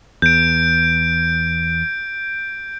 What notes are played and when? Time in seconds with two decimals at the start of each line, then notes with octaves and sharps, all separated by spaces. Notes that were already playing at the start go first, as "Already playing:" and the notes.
0.22 E2 G6 D7